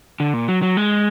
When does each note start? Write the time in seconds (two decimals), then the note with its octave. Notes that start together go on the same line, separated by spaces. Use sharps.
0.20 D3
0.34 A#2
0.48 F#3
0.62 F#3
0.77 G#3